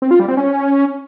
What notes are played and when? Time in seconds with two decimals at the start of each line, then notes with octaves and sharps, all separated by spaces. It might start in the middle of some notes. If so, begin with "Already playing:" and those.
0.02 C4
0.11 F4
0.20 G3
0.28 C4
0.37 C#4